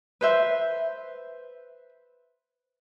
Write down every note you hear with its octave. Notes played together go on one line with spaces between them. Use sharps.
B4 C5 E5